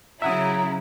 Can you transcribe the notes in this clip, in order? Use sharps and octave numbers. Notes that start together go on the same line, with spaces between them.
C#3 F#3 E4 E5 F#5 A#5 D#6